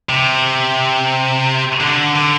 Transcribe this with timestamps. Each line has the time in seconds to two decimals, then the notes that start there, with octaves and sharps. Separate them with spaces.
0.09 C3
1.81 D3
2.15 D3